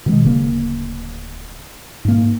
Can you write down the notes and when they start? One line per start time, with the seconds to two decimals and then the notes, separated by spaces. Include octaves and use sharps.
0.06 B2 D#3 G#3
0.23 D1 C#3 A#3
2.05 G#2 A#3